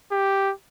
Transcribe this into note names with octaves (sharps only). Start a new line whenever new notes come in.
G4